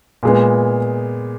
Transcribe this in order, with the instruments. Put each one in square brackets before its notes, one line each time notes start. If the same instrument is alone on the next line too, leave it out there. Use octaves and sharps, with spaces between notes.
[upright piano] A#2 G#3 B3